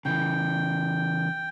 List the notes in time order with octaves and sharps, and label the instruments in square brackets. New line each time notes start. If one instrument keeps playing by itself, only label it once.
[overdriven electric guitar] C#3 E3 [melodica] G5